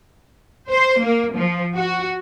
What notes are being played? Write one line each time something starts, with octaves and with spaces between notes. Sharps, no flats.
C5
A#3
F3
F#4